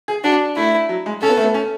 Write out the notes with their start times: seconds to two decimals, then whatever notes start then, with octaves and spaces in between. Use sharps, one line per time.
0.08 G#4
0.24 D4 F#4
0.56 A3 E4
0.89 F#3
1.06 G#3
1.22 C#4 A4
1.29 B3
1.37 A3
1.44 B3
1.54 C#4